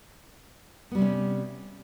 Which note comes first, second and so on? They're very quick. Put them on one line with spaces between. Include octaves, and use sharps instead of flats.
B3 G3 C3 C#4